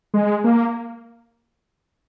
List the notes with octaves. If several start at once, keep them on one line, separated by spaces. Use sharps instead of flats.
G#3
A#3